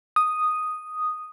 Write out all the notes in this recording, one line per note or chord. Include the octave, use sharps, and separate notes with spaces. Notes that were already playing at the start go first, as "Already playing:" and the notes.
D#6